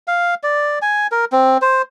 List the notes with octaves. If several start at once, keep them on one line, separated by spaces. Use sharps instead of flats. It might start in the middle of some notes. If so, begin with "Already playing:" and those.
F5
D5
G#5
A#4
C4
C5